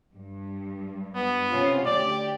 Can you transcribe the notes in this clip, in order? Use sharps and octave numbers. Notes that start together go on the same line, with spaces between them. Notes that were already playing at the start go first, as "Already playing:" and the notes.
G2
B3
C3 C#4 F4
D2 G4 D5